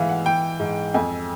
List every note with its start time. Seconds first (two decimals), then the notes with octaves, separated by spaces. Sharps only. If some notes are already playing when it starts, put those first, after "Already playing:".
Already playing: G#2 E3 E5 F5
0.09 F#5
0.25 E3 G5
0.60 G#2
0.94 F2 G#5